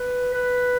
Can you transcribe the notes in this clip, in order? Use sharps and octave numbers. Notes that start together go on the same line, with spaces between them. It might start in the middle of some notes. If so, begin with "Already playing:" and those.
Already playing: B4
B4